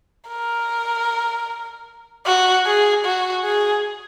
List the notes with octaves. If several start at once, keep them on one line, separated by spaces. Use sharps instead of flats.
A#4
F#4
G#4
F#4
G#4